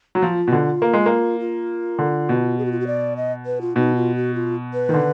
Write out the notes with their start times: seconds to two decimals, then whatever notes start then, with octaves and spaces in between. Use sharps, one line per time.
0.15 F#3
0.22 F3 F4
0.47 B2
0.52 D3
0.82 A#3
0.93 G#3
1.06 A#3
1.40 F4
1.99 D3
2.29 B2
2.58 G#4
2.65 F#4
2.72 F4
2.80 F#4
2.87 D5
3.17 D#5
3.46 B4
3.61 F4
3.76 B2 D#4
3.96 F4
4.16 F#4
4.35 F4
4.73 B4
4.89 D#3
4.94 D3